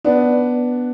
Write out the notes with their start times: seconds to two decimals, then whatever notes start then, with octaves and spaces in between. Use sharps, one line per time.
0.04 B3 D4